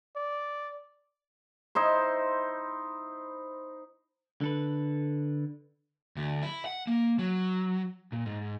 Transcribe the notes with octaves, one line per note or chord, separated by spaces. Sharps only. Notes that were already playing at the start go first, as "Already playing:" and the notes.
D5
D#4 E4 C5
D3 A4 B4
D2
E4
F#5
A#3
F#3
A#2
G#2